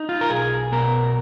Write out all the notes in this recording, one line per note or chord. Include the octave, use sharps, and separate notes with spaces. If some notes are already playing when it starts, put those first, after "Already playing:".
Already playing: D#4
F4
A#4
B1 G#4
B2 A#4